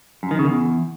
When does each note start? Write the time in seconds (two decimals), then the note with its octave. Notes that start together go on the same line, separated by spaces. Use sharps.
0.23 F#2
0.31 D#3
0.39 C#3
0.47 E2